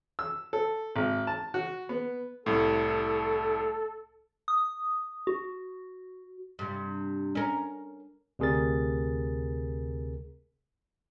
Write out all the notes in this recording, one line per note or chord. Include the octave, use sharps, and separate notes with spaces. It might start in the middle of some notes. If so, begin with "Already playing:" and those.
E6
A4
G#1
A5
F#4
B3
C2 A2 A4
D#6
F#4
G2 C3
C#4 A#4
D2 C3 G#4 A#4 A6